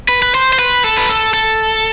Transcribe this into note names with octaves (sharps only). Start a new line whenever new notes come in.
B4
B4
C5
C5
B4
A4
B4
A4
A4